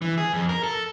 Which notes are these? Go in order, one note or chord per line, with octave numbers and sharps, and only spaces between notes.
E3
G#4
F2
A#4
A4